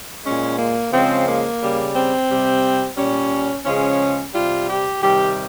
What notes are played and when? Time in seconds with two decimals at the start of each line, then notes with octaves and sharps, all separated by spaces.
0.23 A#2 G#3 C#4
0.57 A#3
0.91 C#3 F3 G#3 C4
1.25 A#3
1.59 C#3 G3
1.94 C4
2.29 C3 G3
2.96 A#2 G3 C#4
3.64 C#3 F3 G#3 C#4
4.33 C3 G3 F4
4.67 G4
5.00 C3 D#3 G3 G4